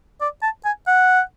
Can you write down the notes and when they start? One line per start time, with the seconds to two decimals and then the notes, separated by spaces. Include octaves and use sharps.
0.21 D5
0.43 A5
0.65 G#5
0.87 F#5